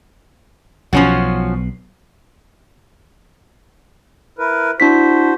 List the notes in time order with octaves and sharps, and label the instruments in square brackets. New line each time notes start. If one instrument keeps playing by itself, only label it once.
[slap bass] B1 B2 [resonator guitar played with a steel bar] F3 C#4 F#4
[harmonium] E4 A#4 B4
[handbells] D4 E4 B6 [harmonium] F#4 C5